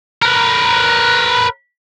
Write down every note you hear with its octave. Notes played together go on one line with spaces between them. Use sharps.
A#4 B4